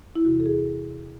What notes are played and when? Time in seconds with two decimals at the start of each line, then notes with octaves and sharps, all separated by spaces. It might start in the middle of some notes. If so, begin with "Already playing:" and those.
0.16 E4
0.25 E2 C3 E3 F#4
0.40 A4
0.46 G#4